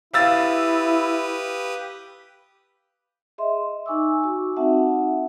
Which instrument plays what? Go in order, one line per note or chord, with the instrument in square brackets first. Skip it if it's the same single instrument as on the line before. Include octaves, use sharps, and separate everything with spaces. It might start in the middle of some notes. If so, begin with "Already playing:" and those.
[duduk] E4 [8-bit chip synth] G4 B4 D#6 [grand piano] F5 E6 A6
[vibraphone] G#4 D#5 E5 C6
D#4 G#5 C#6 D6 E6
F#4 C#6 E6
C4 D#4 F#4 E5 F#5 A5